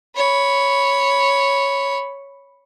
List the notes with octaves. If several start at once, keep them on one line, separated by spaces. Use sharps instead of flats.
C#5 B5